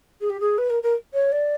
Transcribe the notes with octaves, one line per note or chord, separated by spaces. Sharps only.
G#4
G4
G#4
B4
A#4
A#4
C#5
D5